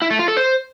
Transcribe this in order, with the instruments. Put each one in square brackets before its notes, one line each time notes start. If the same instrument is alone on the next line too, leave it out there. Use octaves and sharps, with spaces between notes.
[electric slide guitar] E4
A3
F4
A4
C5